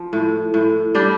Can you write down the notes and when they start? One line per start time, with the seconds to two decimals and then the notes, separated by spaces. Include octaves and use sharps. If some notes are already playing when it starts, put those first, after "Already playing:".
Already playing: F3
0.13 A2
0.54 A2
0.95 G3 D4 G4